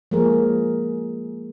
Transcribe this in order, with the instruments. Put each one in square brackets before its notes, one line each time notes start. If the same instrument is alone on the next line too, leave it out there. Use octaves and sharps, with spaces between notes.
[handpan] F3 G#3 A#3 G#4 A#4